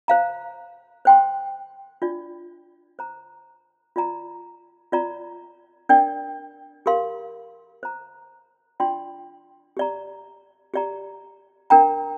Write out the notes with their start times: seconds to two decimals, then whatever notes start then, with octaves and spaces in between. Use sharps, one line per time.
0.08 C5 F5 A#5
1.05 C5 G5 C6
2.02 D4 F4 D5
2.99 C5 A#5
3.96 F4 D5 A#5
4.92 F4 D5 A#5
5.89 D4 A#4 D5 G5
6.86 G4 A#4 F5 C6
7.83 C5 A#5
8.80 D4 F4 D5 G5 C6
9.77 G4 D5 A#5
10.74 G4 D5 A#5
11.70 D4 A#4 G5 A#5